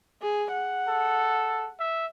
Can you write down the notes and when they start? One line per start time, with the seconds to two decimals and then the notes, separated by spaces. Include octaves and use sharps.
0.22 G#4
0.52 F#5
0.88 A4
1.79 E5